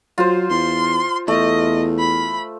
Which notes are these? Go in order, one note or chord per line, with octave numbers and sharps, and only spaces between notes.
F#3 F4 C5
E2 C6
E2 A3 D#5
B5